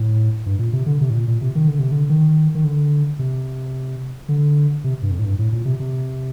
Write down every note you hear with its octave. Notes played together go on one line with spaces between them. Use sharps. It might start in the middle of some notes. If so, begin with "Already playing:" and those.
Already playing: A2
G2
A#2
C3
D3
C3
A2
A#2
A#2
C3
D#3
D3
C3
D3
D#3
D#3
D3
C3
D3
C3
G2
F2
A2
G2
A2
A#2
C3
C3